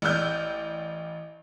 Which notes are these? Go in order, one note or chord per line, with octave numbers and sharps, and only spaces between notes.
A1 D5 E6 F6 G6